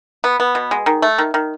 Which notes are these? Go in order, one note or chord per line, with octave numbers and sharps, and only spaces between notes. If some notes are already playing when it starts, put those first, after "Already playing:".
B3
B3
B2
G#3
D#3
A3
D#3
D#3